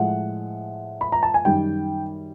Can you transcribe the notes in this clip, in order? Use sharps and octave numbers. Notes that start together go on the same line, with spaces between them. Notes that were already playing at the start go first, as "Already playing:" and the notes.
Already playing: A2 F3 G#3 F#5
B5
A#5
A5
G#5
F#2 D#3 G3 G5